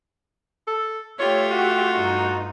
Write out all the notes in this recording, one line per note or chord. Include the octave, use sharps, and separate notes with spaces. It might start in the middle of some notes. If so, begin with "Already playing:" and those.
A4
A3 F4 G4 C#5 E5
F#4
G2 D#4